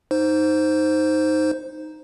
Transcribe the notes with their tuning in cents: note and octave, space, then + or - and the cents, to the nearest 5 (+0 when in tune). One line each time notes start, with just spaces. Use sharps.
D#4 +0 C5 +0